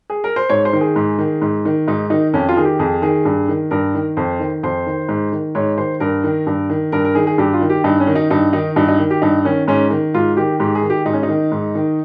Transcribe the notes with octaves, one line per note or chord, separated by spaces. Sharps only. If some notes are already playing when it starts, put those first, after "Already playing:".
G#4
A#4
C5
G#2 C#5
C5
D#3
G#4
G#2
D#3
G#2
D#3
G#2 D#4
D#3 D#4
F2 C#4
F4
D#3 G#4
G4
F2 G#4
D#3 G#4
G2
D#3
G2 A#4
D#3
F2 C5
D#3
F2 C5
D#3
G#2
D#3
G#2 C#5
D#3 C5
G2 A#4
D#3
G2
D#3
G2 A#4
A#4
D#3 G#4
G#4
G2 G4
F4
D#3
G4
G2 D#4
C#4
D#3
D#4
G2 D#4
D#3 D#4
G2 D#4
D#4
D#3
G4
G2 D#4
D#3 C#4
G#2 C#4
D#3
G#2 F4
D#3 G4
G#2 G4
G#4
D#3
G4
G#2 D#4
C#4
D#4
D#3
G#2
D#3